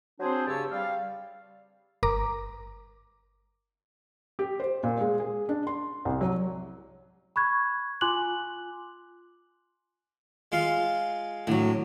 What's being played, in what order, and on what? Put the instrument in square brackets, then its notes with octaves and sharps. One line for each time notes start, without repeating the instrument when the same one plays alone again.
[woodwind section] F#3 C4 D4 G#4 C5
G2 C#3 G4 C#5 A5 E6
G3 F5
[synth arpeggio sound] G1 A#4 A#5 D6
[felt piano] G4
C5
A#2
G#3
G#4
D4
C6
C2
F#3
[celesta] B5 C#6 F#6 G#6
F4 G#5 C6 D6 F#6 F#7
[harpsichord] G#3 F4 F5
[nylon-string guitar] A2 F#3 [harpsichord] D3